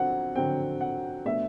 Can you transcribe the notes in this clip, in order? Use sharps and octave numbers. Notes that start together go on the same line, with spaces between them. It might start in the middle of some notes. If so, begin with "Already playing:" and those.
Already playing: D3 F#3 C4 F#5
D3 F#3 C4 G5
F#5
B2 A3 D4 E5